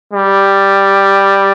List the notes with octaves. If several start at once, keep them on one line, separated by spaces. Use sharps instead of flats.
G3